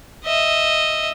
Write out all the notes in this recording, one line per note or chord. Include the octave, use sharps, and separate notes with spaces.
D#5 E5